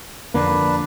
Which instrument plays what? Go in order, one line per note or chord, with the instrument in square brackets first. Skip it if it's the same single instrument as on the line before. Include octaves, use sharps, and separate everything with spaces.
[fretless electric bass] F2 D3 A#3 [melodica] D4 B4